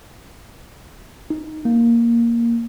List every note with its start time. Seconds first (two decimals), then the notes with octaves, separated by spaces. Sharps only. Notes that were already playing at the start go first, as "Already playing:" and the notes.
1.30 D#4
1.65 A#3